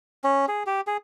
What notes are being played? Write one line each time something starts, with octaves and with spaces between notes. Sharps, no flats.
C#4
G#4
G4
G#4